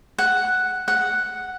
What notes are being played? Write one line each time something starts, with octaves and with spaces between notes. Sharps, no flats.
F#5
F#5